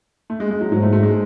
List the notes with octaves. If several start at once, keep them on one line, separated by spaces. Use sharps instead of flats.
A3
G#3
G#3
F#3
G#2 F#3
A3
A3
G#3